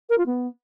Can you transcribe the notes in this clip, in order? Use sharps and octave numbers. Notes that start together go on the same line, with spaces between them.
A#4
F4
B3